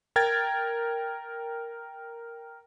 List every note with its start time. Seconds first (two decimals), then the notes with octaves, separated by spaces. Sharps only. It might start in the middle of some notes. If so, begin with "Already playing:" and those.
0.16 A#4 G5 G#6 A6